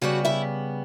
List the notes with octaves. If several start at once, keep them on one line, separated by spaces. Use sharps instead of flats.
C#3 G3 B3 F#4 F#5
E4 E5